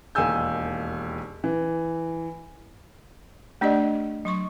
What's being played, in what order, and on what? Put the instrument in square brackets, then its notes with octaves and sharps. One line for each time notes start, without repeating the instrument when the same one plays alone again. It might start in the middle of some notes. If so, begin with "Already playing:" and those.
[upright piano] E1 D#2 G#4 G#5 E6 G6
E3
[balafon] A3 D4 G4 D5 D#5
F#3 C6 C#6